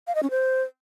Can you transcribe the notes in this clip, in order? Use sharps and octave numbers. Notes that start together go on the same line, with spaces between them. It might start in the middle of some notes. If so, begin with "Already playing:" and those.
F5
D#5
C#4
C5